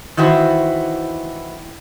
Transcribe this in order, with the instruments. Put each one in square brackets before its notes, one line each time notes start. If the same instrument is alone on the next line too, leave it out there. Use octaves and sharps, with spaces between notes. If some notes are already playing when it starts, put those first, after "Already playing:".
[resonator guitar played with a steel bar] D#3 E3 E4 F#4 C5